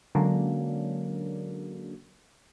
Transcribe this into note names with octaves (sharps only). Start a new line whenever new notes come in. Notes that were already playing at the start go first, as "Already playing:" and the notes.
D3 F#3 G#3 A#3 C#4 D4